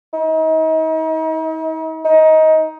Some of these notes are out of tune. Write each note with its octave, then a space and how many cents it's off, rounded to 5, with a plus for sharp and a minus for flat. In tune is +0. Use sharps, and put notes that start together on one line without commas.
D#4 +40
D#4 +20